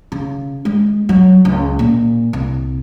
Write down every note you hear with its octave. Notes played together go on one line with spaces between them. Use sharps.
C#3
G#3
F#3
C#2
A#2
C2